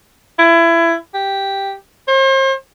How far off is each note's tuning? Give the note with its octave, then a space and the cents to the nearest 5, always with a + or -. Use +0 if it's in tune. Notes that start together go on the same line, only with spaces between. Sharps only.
E4 +25
G4 +0
C5 +40